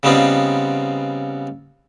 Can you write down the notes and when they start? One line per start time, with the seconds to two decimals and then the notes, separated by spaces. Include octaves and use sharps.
0.03 C#3 G3 B3 C4 D#4 F4